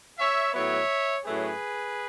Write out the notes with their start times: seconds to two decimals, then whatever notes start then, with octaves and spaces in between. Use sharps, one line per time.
0.19 C#5 E5
0.53 A2 F#3 B3 C#5 E5
1.25 A2 F#3 A3 C#4 G#4 B4